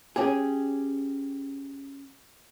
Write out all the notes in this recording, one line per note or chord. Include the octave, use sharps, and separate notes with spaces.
C#4 G4 G#4